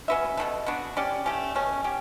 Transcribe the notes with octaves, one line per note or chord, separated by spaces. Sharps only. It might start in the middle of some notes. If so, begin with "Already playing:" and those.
C#4 F#4 B4 E5
B2 F#3 A3
B3 D4 F#4
C#4 G4 D5
A3 C#4 G4
B2 A3 C#4
C#4 G4